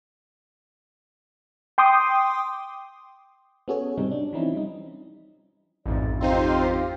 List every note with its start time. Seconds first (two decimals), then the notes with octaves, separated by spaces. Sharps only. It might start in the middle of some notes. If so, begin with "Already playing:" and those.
1.78 G5 C6 D6 D#6
3.68 B3 C#4 F#4 G#4 A4 C#5
3.98 G#2 C3 G3 C4 D#4
4.11 D4
4.33 E3 F3 C4 C#4 D#4 E4
4.54 G3 D#4
5.86 A1 F2 G#2 D5
6.21 C4 D#4 F4 G4 C5 F5